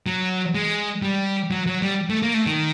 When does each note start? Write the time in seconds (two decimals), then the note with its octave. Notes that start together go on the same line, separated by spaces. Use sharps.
0.06 F#3
0.55 G#3
1.02 G3
1.51 F#3
1.66 F#3
1.82 G3
2.10 A3
2.22 A#3
2.34 A3
2.46 D#3